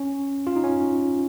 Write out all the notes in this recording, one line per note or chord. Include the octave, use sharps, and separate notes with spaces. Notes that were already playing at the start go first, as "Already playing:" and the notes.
Already playing: C#4
F4
D#4
C#4